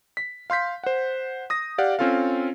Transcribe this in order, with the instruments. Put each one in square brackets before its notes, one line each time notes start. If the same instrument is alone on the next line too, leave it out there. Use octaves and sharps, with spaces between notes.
[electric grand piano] B6
F5 C6 G6 B6
C5 F#5
D#6 A#6
G4 D5 F5 F#5
C4 C#4 F4 A4 F5